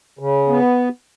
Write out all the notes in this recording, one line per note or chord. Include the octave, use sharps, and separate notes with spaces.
C#3
B3